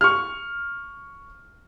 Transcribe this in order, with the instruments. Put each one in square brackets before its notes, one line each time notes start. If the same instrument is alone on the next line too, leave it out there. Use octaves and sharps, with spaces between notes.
[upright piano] C#6 F6